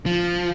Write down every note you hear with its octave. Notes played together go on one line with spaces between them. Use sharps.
F3